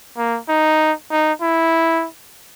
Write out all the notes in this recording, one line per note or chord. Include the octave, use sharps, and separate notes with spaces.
A#3
D#4
D#4
E4